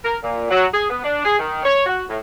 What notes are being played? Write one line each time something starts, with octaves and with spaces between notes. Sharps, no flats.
A#4
A#2
F#3
G#4
B3
D4
G#4
D#3
C#5
F#4
A2